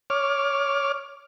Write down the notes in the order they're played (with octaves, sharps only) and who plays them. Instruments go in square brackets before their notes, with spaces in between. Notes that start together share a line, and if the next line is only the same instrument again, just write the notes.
[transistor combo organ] C#5 D6 F6